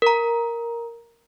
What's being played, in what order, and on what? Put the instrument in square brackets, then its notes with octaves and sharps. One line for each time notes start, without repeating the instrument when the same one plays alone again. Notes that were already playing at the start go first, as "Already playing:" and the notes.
[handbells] A#4 A#5